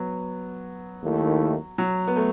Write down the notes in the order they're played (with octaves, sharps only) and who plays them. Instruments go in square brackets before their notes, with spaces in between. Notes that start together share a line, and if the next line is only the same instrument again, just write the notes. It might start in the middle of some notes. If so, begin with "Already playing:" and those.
Already playing: [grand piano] F#3 B3
[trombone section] D#2 D#3 A3 E4
[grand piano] F#3
B3
A3